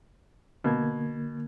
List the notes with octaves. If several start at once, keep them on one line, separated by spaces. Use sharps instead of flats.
B2 D3 A#3 G#6